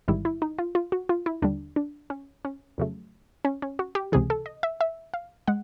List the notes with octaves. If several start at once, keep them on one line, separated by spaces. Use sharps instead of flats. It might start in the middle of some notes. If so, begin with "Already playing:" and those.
A1 G#2 D#3 G3 E4
E4
D#4
F4
F4
F#4
F4
E4
D#2 D3 G3 D4
D4
C#4
C#4
F2 C#3 F#3 A3
C#4
C#4
F#4
G4
C#2 C3 E3 G#4
A4
D#5
E5
E5
F5
G#3 F#5